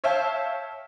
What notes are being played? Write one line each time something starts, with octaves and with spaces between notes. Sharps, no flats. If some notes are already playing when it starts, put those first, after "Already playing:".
C#5 E5 F5 G5 A5